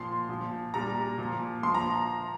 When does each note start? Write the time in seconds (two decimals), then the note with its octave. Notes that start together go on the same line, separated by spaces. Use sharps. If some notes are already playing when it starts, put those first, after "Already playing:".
Already playing: A#2 F3 C6
0.29 A#2 F3
0.74 A#2 G3 A#5
1.18 A#2 F3
1.63 A#2 F3 C6
1.74 A#5